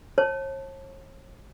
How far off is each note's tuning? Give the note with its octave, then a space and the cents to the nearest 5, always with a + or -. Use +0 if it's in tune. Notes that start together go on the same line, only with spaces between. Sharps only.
C#5 -40 A5 +0